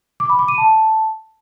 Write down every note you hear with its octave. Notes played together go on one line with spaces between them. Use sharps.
D6
B5
D6
D#7
A5